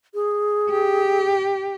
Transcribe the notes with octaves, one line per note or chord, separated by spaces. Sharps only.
G#4
G4